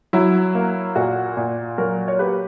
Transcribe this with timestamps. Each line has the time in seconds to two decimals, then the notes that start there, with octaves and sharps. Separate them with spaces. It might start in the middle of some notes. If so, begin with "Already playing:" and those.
0.13 F#3 E4
0.55 A#3
0.95 A#2 F#4
1.37 A#2
1.78 F#3 F#4 A#4
2.08 C#5
2.19 A#3 G4 B4